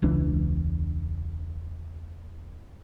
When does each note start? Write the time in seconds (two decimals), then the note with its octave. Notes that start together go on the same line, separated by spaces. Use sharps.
0.02 E1 C#2 E3 D4